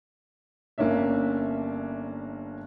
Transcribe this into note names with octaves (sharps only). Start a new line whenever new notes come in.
G1 A#3 C#4 D4 E5